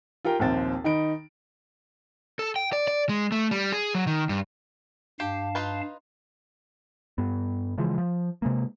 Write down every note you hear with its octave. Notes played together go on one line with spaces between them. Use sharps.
F4 G4 A#4 G5
A#1 D#2 C4 A6
D#3 D#4 B5 D7
A4
G5
D5
D5
G#3
A3
G3
G#4
F#3
D#3
G2
G2 G4 F5 A5
D#4 F4 B4
G2 B3
C#3 E3 F3 G#3
F3
C3 G#3 A#3